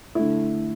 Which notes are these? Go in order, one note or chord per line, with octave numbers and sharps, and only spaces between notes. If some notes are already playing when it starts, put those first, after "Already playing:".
D3 A3 E4